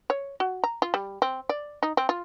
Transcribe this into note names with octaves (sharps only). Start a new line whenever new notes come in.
C#5
F#4
A#5
F4
G3
C4
D5
D#4
C4
F4